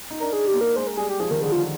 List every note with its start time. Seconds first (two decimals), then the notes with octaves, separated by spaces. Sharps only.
0.10 D#4
0.20 D4 A#4
0.33 G#4
0.47 G4
0.54 A#3
0.61 A#4
0.76 G#3 C5
0.87 A#4
0.97 G3 G#4
1.09 G4
1.20 F3 G#4
1.31 D#3 A#4
1.42 D3 G#4
1.52 F4